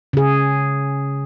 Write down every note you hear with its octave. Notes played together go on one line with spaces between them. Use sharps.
C#3 G#4